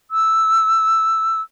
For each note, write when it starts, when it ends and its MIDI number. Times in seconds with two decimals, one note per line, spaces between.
0.11 1.41 88